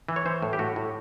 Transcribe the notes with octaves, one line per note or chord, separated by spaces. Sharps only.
E3
C#5
E3 C5
A2
G4
A2 F#4
A2